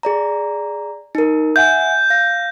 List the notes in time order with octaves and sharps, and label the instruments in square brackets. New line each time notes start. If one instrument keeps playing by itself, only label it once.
[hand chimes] G#4 D5 A#5
D#4 A#4
[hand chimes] E5 F#5 G#5 [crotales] G6
[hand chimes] F5 A#6